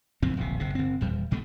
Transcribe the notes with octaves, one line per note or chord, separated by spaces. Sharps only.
F#1 F2 A2 C4
D1 A#1 C3
F#1 C3
F#1 C4
D#1 E2 G3
F#1 B2 G3 A3